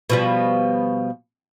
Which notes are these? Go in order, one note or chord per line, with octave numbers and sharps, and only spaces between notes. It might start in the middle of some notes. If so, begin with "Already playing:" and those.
B2 F3 G3